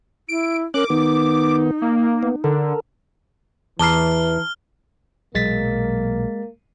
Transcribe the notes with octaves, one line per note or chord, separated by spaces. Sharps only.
E4 D7
C#4 A#4 D6 F#6
D#3 B3 D#4
A#3
B3
D3 A4 A#4
E2 E3 A5 A#5 F6 C7 G7
B1 A#2 F#3 G#3 A#3 A6 B6